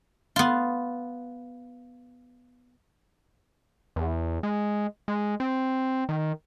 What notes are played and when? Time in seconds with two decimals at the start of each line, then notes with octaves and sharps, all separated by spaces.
0.36 B3 F4
3.96 E2
4.43 G#3
5.08 G#3
5.40 C4
6.09 D#3